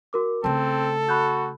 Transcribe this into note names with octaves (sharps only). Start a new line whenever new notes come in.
F#4 A#4 D6
C#3 A3 C4 A4 A5
F#4 B5 F#6 G6